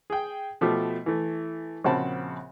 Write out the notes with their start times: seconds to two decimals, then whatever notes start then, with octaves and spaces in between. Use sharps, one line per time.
0.10 G#4 G5
0.61 B2 F3 A3 G4
1.06 E3 A3
1.84 A#1 C#3 C4 F#4 A5 B5